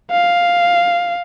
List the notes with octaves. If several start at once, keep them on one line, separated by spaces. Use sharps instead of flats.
F5